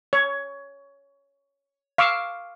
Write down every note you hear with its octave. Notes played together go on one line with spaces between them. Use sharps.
C#5
F5 C#6 D6 E6